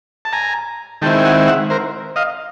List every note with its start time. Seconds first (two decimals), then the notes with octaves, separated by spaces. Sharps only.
0.25 A5
0.33 G#5 A#5
1.02 D#3 G#3 C4 E4 G5 A5
1.19 G5
1.25 F#5 G#5
1.47 E5 F#5
1.70 A#4 C5
2.16 D#5 F5